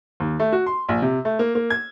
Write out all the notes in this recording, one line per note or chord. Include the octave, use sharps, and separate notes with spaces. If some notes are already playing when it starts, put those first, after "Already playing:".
D#2
A3
F#4
C6
A#1
C3
A3
A#3
A#3
G#6